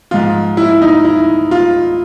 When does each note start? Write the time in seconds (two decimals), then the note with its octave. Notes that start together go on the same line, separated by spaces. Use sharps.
0.11 G#2 F3 F4
0.57 E4
0.82 D#4
1.05 E4
1.51 F4